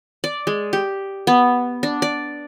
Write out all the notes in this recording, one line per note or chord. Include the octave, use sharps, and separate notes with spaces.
D5
G#3
G4
B3
D4
D5